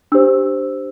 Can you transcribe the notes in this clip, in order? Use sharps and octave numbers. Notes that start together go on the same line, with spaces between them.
D4 G4 C5 E6